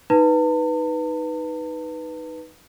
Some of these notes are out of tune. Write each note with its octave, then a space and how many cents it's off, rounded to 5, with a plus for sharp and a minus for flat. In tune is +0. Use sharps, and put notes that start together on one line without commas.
D#4 +5 B4 -5 A5 +40